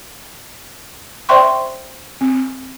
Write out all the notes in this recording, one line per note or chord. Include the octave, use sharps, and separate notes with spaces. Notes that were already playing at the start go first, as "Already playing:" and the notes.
C5 D5 E5 G5 C6 C#6
C4